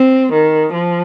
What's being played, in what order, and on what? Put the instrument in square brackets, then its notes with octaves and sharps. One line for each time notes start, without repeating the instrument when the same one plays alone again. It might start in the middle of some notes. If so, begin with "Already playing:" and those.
Already playing: [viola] C4
D#3
F3